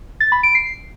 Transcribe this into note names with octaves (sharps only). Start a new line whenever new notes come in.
A6
B5
D7
C7